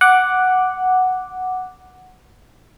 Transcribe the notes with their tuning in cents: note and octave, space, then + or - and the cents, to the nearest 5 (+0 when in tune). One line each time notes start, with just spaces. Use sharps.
F#5 +0 D6 +0